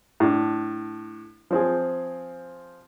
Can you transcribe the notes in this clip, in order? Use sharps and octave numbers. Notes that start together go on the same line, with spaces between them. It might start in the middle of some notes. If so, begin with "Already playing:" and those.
A2 D4
F3 C4 G#4